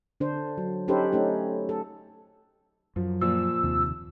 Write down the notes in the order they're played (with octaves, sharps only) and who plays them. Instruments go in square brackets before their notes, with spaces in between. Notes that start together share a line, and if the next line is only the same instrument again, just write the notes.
[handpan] D3 D4 C5
F#3
C#4 D#4 G4 A4 B4 C5
A3 C#4 D#4 G4
A4
[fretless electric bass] F#2 F#3 [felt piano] F3
[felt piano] A#2 F3 [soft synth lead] E6
[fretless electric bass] D#2 C3